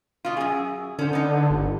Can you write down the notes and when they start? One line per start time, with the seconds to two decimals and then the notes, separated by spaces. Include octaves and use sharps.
0.25 B2 F4
0.37 F#2 G#4
0.99 D3 C#4 C5
1.13 B3 D#4
1.50 G1